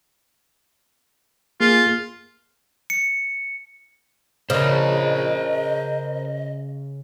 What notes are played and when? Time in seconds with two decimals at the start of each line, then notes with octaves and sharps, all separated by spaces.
1.60 A#3 F4 G#4
2.90 C#7
4.50 C#3 A#4 C5 D#5